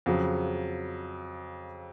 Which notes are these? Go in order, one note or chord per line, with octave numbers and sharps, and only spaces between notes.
F2 C#3 F#3